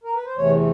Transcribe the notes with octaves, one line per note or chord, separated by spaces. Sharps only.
A#4
B4
C5
E2 C3 E3 A3 C#5